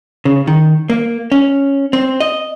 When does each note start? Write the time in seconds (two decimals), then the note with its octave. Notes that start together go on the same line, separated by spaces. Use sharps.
0.25 C#3
0.47 D#3
0.90 A#3
1.32 C#4
1.93 C4
2.20 D#5